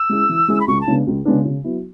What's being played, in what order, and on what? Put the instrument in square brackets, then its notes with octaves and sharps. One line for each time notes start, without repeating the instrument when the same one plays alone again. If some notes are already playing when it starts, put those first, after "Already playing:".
Already playing: [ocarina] E6
[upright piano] G#3 C#4 E4 G#4
E3
G#3 C#4 E4 G#4
[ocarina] B5
[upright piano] C#2 [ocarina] C#6
[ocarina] A5
[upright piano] C#3 G#3 B3 D4
C#2
C#3 G#3 B3 D4
C#3
F#3 B3 E4